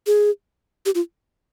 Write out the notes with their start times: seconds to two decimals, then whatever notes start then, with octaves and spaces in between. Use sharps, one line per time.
0.07 G#4
0.86 G4
0.95 F4